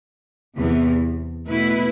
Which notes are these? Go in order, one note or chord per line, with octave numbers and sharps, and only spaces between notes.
E2 C3 E3 B3
B2 A3 E4 B4